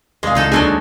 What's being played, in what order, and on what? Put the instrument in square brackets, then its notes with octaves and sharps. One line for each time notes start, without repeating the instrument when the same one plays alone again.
[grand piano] C2 [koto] G#3 [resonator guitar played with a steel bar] G#4 F5
[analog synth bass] C#2 [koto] G#3 D#4 A4
[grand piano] D#2 G#3 [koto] F#3 A4 G#5 [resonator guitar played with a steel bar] D4 F#4